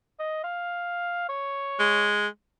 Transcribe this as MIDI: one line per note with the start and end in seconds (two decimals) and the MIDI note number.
0.19 0.39 75
0.44 1.26 77
1.29 2.10 73
1.80 2.27 56